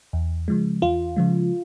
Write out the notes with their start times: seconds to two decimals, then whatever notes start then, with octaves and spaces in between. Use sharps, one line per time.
0.13 E2
0.48 C#3 F3 G#3
0.82 E2 F4
1.16 C#3 F3 G#3